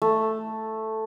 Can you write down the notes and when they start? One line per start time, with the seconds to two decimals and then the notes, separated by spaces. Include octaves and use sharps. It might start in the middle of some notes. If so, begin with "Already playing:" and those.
0.02 A3